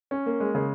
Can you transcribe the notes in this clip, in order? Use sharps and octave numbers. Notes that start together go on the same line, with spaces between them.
C#4
A#3
G#3
C#3